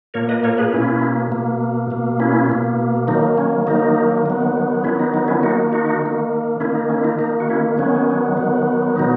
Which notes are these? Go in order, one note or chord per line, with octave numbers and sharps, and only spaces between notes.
A#2 A#3 A#4 C#5
B4 D#5
A#4 C#5
G#4 B4
B2 A#3 C#4 E4
B2 A#3
B2 A#3
C#4 E4
B2 A#3
D#3 F#3 A#3 D#4
C#4
D#3 F#3 A#3 D#4
D#3 F#3 B3
D#3 F#3 B3 C#4 E4
D#4
D#4
C#4 E4
D#3 A#3 D#4 F#4
D#4 F#4
D#3 A#3
D#3 A#3 C#4 E4
D#4
C#4
E4
D#4
D#3 A#3 D#4
F#4
C#4 E4
D#3 F#3 B3 C#4
D#3 F#3 B3
B2 F#3 B3 D#4